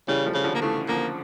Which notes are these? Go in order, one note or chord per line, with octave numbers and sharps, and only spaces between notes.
C#3 E3 G3
F3 A3
C#3
D3 F3
A#3
C#3 E3 A3
D3 F3 A#3